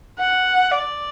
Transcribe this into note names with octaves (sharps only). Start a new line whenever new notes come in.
F#5
D5